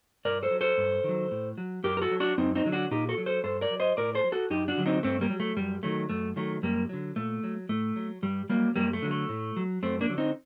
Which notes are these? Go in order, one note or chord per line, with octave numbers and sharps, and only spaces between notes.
G2 A#4 D5
A4 C5
F#3
A4 C5
G2
D#3 F#3
A2
F#3
F#2 G4 A#4
A#4
F#4 A4
F#3
D4 F#4
F#2 C4 D#4
C4 D#4
D3 F#3
D4 F#4
A#2 D#4 G4
F#4 A4
F#3
A4 C5
G2 A4 C5
A#4 D5
F#3
C5 D#5
A2 A#4 D5
A4 C5
F#3
F#4 A4
F#2 D#4 G4
D4 F#4
D3 F#3
C4 D#4
G2 A3 C4
G3 A#3
F#3
A3
F#2 G3
D#3 F#3 A3
F#2 A3
D#3 F#3 A3
F#2 G3 A#3
D3 F#3
A#2 A3
F#3
A2 A3
F#3
G2 G3
F#3 G3 A#3
F#2 G3 A#3
A3
D3 F#3
A3
A2
F#3
F#2 A3 C4
A#3 D4
D3 F#3
C4 D#4